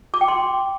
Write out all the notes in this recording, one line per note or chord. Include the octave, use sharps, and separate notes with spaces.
D6
G5
C6